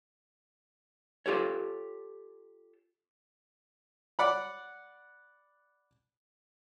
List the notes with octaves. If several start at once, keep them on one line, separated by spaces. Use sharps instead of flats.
F4 G4 A4 C#5
D5 F#5 B5